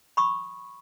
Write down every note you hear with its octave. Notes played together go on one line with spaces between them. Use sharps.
B5 C#6 D#6